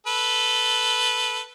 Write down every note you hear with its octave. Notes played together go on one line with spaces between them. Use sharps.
A4 B4